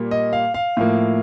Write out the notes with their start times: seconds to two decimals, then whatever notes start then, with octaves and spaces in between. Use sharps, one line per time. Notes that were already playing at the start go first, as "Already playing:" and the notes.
Already playing: A#2 G3 A#3
0.11 D#5
0.33 F5
0.54 F5
0.77 A2 F3 A#3